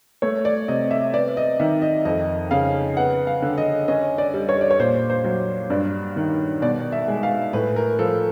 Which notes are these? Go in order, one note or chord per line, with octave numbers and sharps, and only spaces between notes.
A3 C#5
D5
C3 D#5
E5
B3 D5
D#5
D#3 E5
D#5
F2 D#5
C#3 F5
B3 F#5
F5
D3
D#5
C#4 D#5
D5
G3
C#5
D5
C#5
A#2 C5
C5
F#3
G2 D5
D#3
B2 D5
E5
G#3
F5
A2 B4
A#4
F3 A4